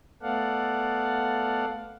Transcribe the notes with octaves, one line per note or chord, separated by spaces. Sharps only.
A3 B3 A4 D5 F5 F#5